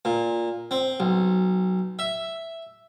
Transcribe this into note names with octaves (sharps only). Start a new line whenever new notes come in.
A#2
C4
B1
E5